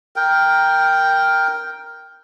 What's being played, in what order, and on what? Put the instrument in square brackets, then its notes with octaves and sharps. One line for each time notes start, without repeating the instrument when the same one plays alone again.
[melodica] A#4 G5